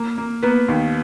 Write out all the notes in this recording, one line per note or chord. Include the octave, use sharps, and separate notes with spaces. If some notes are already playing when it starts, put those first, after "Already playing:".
Already playing: A#3
A#3
A#3 B3 B4
D#2